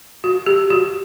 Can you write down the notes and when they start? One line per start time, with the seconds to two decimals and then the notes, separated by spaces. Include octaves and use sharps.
0.24 F#4
0.46 G4
0.70 F#4